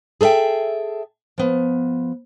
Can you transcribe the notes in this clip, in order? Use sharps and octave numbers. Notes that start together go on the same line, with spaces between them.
G#4 A4 C5 E5 G5
F3 B3